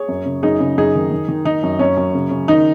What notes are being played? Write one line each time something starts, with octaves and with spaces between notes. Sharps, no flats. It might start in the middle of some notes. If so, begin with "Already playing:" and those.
Already playing: G#4 C#5
F#2
C#3
F#2 D#4 G#4
C#3
F#2 D#4 G#4
D#3
D#3
D#3
D#3 D#4
F#2
F#2 C#4
F#2
C#3
C#3
D#3 D#4